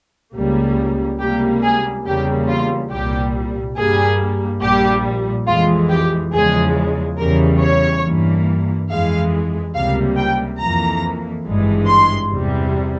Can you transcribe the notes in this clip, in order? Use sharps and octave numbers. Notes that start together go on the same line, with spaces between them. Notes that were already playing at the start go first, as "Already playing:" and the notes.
C#2 C#3 G3 A#3
C#2 C3 G3 A#3 G4
G#4
E2 C#3 G3 A#3 G4
F4
C2 A#2 G3 G4
G2 G3 A#3 G#4
A#1 A#2 G3 G4
F2 E3 G#3 F4
G4
E2 C#3 F3 G#3 G#4
E2 C#3 E3 G3 A#4
C#5
G2 E3 A#3
F2 E3 G#3 F5
C#2 C3 G3 A#3 F5
G5
F2 E3 A#3 A#5
G#1 G2 E3 G#3
C6
E2 C3 G3